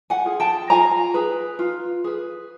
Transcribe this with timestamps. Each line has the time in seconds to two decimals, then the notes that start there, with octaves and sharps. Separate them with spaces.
0.10 F#5 G#5
0.25 F4 G#4
0.40 G5 A5
0.70 F4 G#5 A#5
1.14 G#4 B4
1.59 F4
2.04 G#4 B4